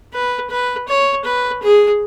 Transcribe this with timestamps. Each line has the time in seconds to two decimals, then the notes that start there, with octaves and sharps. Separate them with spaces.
0.13 B4
0.50 B4
0.88 C#5
1.25 B4
1.63 G#4